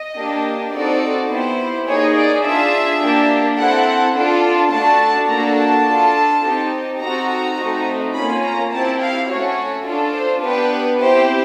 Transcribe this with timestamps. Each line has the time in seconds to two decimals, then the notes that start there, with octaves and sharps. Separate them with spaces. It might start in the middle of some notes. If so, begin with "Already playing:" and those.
Already playing: D#5
0.16 A#3 D4 G4
0.73 C4 D#4 F#4 A4 D5
1.30 B3 E4 G4 C5
1.87 A#3 D#4 G#4 C#5
2.16 D5
2.44 D4 F4 G#4 E5
3.02 A#3 D4 G4
3.59 C4 E4 A4 F#5
4.15 D4 F4 A4
4.72 A3 D4 F#4 A4 A5
5.29 A#3 D4 F#4 A4 A#5
5.58 A5
5.87 D4 F4 A4
6.44 C4 D#4 G4
7.01 C4 D#4 F#4 A4 A#5
7.58 A3 C4 D#4 F#4
8.14 A#3 C#4 F4 B5
8.43 A#5
8.72 C4 E4 G4 A5
9.00 F5
9.29 A3 C#4 F#4 C#5
9.86 D4 F4 A4
10.14 C5
10.43 B3 D4 G4 B4
11.00 C4 E4 G4 C5